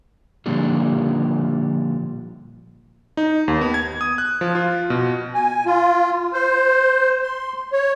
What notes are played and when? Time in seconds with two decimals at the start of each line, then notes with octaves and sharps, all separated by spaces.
0.46 A#2 D3 F3 G3
3.17 D#4
3.48 D#2
3.61 B3
3.74 G#6
4.01 D#6
4.18 F#6
4.41 F3
4.55 F4
4.90 B2
5.34 G#5
5.66 F4
6.33 C5
7.23 C6
7.72 C#5